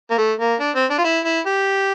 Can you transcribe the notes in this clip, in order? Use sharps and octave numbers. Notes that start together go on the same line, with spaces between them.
A#3
A3
A#3
D4
C4
D4
F4
E4
E4
G4